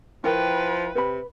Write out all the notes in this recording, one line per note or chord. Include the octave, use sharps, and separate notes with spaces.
F3 E4 A#4 B4 G5 C#6
C3 B4 B5